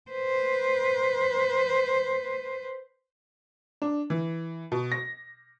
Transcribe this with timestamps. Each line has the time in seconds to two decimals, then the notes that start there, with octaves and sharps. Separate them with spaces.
0.10 B4 C5
3.82 D4
4.10 E3
4.72 B2
4.92 A#6